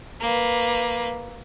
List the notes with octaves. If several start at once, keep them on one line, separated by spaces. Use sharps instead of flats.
A#3 B4